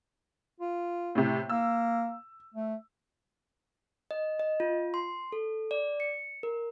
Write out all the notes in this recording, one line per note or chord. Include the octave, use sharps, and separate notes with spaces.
F4
A2 C3
A#3 E6
A3
D#5
D#5
F4
C6
A4
D5
C#7
A#4